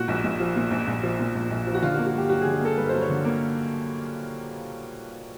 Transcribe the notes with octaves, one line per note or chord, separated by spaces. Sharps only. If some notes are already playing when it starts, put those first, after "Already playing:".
Already playing: A#2 F#4
A#1
A#1
F3
A#2
A#1
A#1
F3
A#2
A#1
A#1
F3
F#4
D3 F4
F#4
A#3
F#4
G2 G4
F#3 F#4
G#4
D3
G#4
A#3 A4
G2 B4
F#3 C5
C#5
D3
A#3